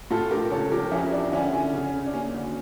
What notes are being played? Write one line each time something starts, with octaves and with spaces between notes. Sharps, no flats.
A2 F4 A4
A#1 G4 A#4
C#2 A4 C#5
F3 G4 A#4
F2 C#4 E4
F2 D4
D3 C#4 E4
D3 C#4
C#3
C#3
D4
A#3 C#4
D2